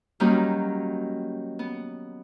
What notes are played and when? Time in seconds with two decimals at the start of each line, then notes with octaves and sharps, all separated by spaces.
0.20 D#3 F#3 G3 A#3 C#4 D#4
1.59 B3